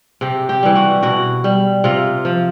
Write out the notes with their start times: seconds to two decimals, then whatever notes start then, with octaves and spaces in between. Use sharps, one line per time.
0.21 C3 G4
0.49 G4
0.63 E3 G3
0.75 F#4
1.03 B2 F#4
1.44 G3
1.84 C3 F4
2.25 F3